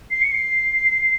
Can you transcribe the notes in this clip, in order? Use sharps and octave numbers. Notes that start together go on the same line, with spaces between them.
C7
C#7
C7